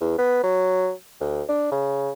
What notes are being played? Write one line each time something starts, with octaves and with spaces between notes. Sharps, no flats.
E2
B3
F#3
D2
D4
C#3